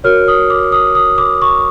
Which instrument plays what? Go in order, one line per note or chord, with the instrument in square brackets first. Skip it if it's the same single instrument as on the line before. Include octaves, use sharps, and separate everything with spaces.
[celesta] F#4 A#4 C#5 F6
D#6
D6
D#6
D#6
D6
C#6